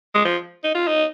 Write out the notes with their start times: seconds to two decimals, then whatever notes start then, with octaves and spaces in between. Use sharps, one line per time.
0.15 G#3
0.25 F3
0.64 D#4
0.75 F4
0.87 D#4